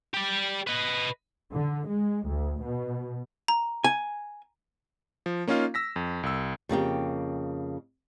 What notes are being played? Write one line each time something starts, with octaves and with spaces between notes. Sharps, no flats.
G4 D5
B4 D#5
D3
G#3
D2
B2
A#5
G#5
F3
A#3 C#4 D#4 F4 F5
E6 A#6 B6
F2
C2 E6
F2 C#3 A#3 G4